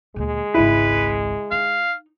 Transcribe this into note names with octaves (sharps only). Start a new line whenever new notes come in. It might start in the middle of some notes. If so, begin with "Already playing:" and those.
D2 A#2 G#3
G#1 C#2 E4 B4
D#4 F5